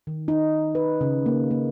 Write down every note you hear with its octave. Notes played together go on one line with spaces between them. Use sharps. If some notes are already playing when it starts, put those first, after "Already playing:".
D#3
D#4
B4
C#3
A#3
A#3